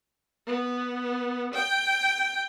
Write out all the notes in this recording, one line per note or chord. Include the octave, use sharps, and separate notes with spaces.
B3
G5